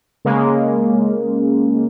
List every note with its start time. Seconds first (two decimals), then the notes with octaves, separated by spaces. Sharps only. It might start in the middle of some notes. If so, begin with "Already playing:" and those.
0.25 C#3 G#3 A#3